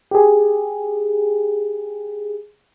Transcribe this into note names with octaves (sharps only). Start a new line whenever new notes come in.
G4 G#4